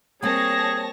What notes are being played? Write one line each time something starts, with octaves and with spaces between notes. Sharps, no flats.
G3 A#3 C4 G#4 C#5 A5 A#6